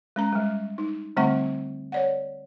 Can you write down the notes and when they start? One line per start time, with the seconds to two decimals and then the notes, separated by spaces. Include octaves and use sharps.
0.16 G#3 C#4 A#5
0.32 G3 G#3
0.78 D#4
1.17 D3 G3 A3 C4 F#5 C#6
1.92 C#5 D5 F#5